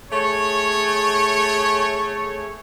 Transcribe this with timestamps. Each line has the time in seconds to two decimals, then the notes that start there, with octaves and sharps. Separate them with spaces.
0.12 A3 G#4 C#5